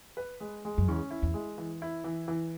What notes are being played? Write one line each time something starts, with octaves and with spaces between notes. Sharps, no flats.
B4
G#3
G#3
F#2
E2 C#4
E4
E2
G#3
E3
E4
E3
E3